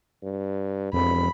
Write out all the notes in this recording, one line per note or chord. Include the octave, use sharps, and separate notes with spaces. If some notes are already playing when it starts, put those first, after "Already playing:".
G2
E1 F2 B5